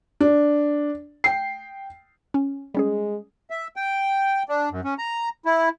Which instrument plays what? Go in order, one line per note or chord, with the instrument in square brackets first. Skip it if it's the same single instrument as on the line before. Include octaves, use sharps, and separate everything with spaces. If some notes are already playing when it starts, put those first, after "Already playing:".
[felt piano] D4
G5 C7
[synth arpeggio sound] C#4
[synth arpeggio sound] G3 C#4 G#4 [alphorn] G#3
[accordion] E5
G5
D4
F#2
C#4
A#5
E4